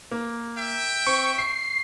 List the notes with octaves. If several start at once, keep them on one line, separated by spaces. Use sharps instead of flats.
A#3
E5 G5
C4 C#6
C#6 C7